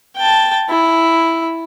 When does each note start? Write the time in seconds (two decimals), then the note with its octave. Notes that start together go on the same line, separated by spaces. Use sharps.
0.17 G5 A5
0.70 E4